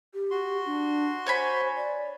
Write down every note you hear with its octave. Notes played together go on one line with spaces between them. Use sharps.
G4
F#4 C6
D4
C5 C#5 G#5 B5
D5